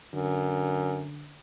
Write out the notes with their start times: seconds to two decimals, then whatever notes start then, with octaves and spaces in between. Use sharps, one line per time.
0.14 F#2 D3